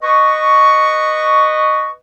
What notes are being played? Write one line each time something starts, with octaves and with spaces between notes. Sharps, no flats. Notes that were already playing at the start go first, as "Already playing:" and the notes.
B4 D#5 C#6